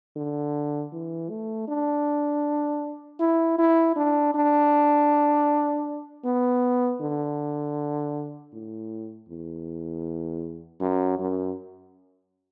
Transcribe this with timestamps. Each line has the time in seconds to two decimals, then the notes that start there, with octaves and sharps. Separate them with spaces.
0.16 D3
0.92 E3
1.30 A3
1.68 D4
3.20 E4
3.58 E4
3.96 D4
4.34 D4
6.25 B3
7.01 D3
8.53 A2
9.29 E2
10.81 F#2
11.19 F#2